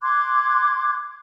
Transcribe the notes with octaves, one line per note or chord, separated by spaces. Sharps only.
C6 D6 F#6 G#6